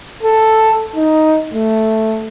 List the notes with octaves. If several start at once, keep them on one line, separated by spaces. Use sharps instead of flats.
A4
D#4
A3